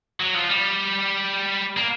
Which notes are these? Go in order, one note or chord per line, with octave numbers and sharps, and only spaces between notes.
F#3
F3
G3
A#3